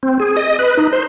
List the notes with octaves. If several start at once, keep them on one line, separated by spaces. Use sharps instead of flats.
C4
G#4
D#5
B4
D#4
C5